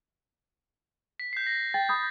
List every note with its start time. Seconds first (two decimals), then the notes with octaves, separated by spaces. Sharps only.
1.20 B6
1.33 G6 C7
1.47 A#6
1.74 G5 A6
1.89 B5 D#6 G6